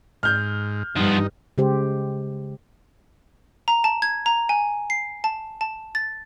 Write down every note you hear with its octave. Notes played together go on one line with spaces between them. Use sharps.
G#2 F6 G6
G2 F3 B3 D#4
C#3 G#3 G4 C5
A#5
A5
G#6
A#5
G#5
C7
A5
A5
A6